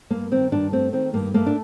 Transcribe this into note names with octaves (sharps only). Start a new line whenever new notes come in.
G2 A#3
D#3 C4
G2 D4
A3 C4
D#3 C4
G2 A#3
A3 A#3
D4